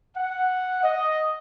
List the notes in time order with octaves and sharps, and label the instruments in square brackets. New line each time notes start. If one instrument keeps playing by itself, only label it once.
[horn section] F#5
D#5